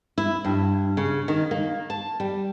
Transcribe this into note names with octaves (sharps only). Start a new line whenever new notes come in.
E4
G2
C#3
D#3
A#3
A5
G3